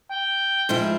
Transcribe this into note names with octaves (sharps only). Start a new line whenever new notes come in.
G5
G#2 F3 E4